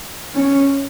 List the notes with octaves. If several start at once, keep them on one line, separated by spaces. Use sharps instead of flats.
C#4